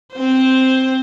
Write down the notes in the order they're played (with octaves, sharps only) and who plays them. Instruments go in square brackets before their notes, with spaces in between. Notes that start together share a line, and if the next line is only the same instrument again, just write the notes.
[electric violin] C4 C5